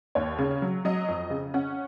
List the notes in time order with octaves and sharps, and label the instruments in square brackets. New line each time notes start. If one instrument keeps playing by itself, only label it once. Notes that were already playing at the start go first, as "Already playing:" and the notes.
[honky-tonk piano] D#2 C#5
C#3
F#3
F#3 D#5
F2
C#3
C#4 F#5